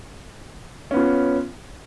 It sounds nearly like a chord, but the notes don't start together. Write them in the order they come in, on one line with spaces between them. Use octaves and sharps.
C#4 B3 F4